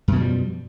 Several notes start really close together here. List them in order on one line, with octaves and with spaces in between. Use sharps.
F#2 B2 F3 G3